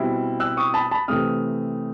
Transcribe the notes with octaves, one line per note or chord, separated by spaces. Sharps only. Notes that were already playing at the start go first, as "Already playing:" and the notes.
Already playing: B2 G3 C4 E4
E6 F#6
C#6 D#6
A5 B5
A5 B5
C3 E3 A3 C4 D#6 F6